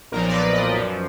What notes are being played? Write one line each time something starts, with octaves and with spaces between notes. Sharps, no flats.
B1 A#2 F3 A#4
D5
B4
D#5
F#2 F3